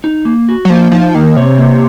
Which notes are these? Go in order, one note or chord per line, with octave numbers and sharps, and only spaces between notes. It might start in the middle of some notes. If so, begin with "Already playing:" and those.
D#4
A#3
F#4
F#3
F3 A#3
F3 D#4
D#3 A#3
C3 C#5
A#3